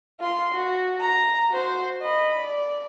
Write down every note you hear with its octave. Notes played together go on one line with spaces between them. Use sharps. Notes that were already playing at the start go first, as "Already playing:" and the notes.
F4 C6
F#4
A#5
F#4 C5
D#5 B5
D5